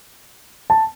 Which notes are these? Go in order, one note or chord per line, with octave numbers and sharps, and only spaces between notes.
A5